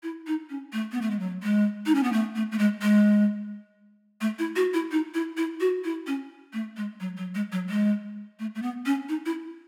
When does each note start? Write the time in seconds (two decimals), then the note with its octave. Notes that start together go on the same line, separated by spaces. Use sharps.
0.03 E4
0.27 D#4
0.50 C#4
0.73 A3
0.92 B3
1.02 A3
1.11 G#3
1.19 F#3
1.43 G#3
1.86 D#4
1.95 C#4
2.03 B3
2.12 A3
2.36 A3
2.52 A3
2.59 G#3
2.82 G#3
4.21 A3
4.39 E4
4.56 F#4
4.74 E4
4.91 D#4
5.14 E4
5.37 E4
5.60 F#4
5.84 E4
6.07 C#4
6.53 A3
6.77 G#3
7.00 F#3
7.17 F#3
7.35 G#3
7.52 F#3
7.70 G#3
8.39 A3
8.55 A3
8.62 B3
8.86 C#4
9.09 D#4
9.26 E4